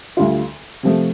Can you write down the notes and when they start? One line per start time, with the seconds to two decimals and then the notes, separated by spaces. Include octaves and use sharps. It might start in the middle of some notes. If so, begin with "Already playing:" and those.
0.17 D2 D3 G3 F4
0.83 C3 F3 A3